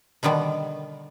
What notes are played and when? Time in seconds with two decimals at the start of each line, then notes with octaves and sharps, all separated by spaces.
0.23 B2 D3 D#3 G3 B3